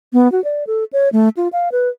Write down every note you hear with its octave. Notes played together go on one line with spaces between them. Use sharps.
B3
F#4
D5
A4
C#5
A3
F4
F5
B4